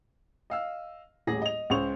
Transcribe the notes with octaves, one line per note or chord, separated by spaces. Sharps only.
D#5 F5 E6
D#1 A1 G#4 A#6
D#5 F7
C#2 C#4 C5 C#6 F7